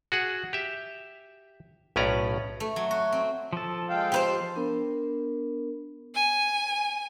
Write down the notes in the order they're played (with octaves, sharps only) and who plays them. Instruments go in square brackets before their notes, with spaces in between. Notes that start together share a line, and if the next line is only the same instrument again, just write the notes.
[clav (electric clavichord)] F#4 G#4 F#5
G4 E5
B1 A2 C#4 B4 D5 A#5
[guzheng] A3
F#3
F#4
C4
[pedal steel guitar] F3 A4
[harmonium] G#3 F5 G5
[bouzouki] G4 B4 C5
[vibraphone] B3 D4 A#4
[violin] G#5